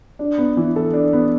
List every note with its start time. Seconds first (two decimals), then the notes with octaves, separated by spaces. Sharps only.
0.19 D4
0.38 B3
0.57 E3
0.76 A4
0.94 D4
1.13 B3